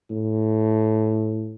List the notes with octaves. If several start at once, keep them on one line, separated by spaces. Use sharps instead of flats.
A2